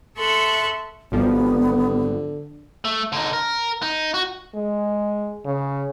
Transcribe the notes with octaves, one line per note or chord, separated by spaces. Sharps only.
A4 E5 C6 C#6 F#6
G#1 D3 F3 G3 B3
A3
D3 D#4
A#4
D#4
F#4
G#3
C#3